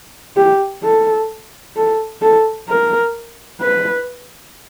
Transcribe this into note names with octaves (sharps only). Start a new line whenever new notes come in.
G4
A4
A4
A4
A#4
B4